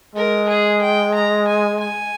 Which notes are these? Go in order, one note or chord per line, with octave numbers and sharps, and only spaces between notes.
G#3 A#4
G#4
G5
A#5
G#5
G#5